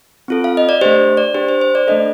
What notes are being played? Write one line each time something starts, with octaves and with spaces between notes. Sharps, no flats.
C4 F4 A4
F5
D#5
D5
A3 D4 G4 C5
D5
D4 G4 C5
C5
C5
D5
A3 D4 A4 D#5